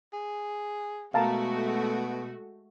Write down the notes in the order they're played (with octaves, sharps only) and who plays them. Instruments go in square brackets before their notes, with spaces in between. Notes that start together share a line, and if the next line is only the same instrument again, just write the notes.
[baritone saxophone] G#4
[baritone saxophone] B2 [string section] G#3 A3 F#4 [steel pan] F5 A5 A#5